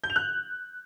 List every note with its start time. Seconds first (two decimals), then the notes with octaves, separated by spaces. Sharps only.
0.04 G6
0.10 F7
0.16 F#6